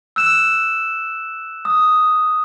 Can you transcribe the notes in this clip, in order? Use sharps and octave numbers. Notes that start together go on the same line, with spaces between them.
E6 F#6 E7
D#6